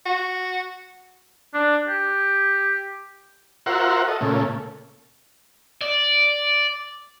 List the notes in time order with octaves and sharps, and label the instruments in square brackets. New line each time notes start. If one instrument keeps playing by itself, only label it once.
[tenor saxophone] F#4
[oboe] D4
G4
[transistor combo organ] F4 F#4 A#4 C5 E5 F#5
A4 D#5
A#2 C#3 A3
[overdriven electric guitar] D5